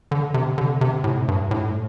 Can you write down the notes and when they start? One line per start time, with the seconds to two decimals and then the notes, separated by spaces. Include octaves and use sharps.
0.11 D3
0.34 C3
0.58 D3
0.81 C3
1.04 A2
1.28 G2
1.51 A2